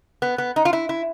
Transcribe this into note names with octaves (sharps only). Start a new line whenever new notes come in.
B3
B3
D#4
F4
E4
E4